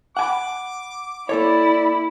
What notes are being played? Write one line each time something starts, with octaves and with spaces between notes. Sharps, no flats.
F#5 G#5 B5 D6
A#3 E4 A4 C#5 D5